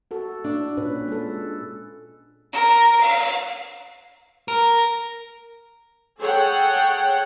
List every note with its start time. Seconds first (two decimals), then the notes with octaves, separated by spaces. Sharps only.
0.11 F#4 A4
0.44 D4
0.77 A#2 C#4 B4
1.08 G#3 A4
2.52 A#4
3.00 F5
4.48 A#4
6.20 G#4 A4 C#5 F#5 G5